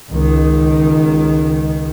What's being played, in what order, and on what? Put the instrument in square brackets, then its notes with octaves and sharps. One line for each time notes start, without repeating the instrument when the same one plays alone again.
[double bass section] C#2 D#3